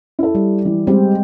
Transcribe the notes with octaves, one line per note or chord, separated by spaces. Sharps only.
E4 A4
G3
E3
G3 G#3 C4